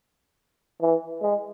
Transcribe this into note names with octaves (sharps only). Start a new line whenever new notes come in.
E3
G#3